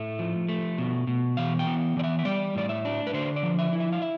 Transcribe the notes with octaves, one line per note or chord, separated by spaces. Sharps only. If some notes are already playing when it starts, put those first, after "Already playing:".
Already playing: A2 A3 E5
F3
A3
B2
B2
E3 F5
G5
B3
E3 D5
E5
E5
G3 D5
A2 D5
E5
D4
B4
D3 C5
D5
F3
E5
E4
E5
F5
E5